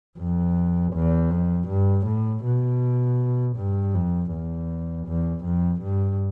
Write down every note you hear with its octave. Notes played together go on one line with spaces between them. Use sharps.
F2
E2
F2
G2
A2
B2
G2
F2
E2
E2
F2
G2